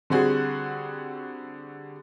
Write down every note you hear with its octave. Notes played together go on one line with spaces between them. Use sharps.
D3 G3 C4 F#4 G#4